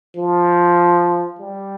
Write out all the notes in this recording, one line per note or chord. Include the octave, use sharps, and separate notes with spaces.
F3
G3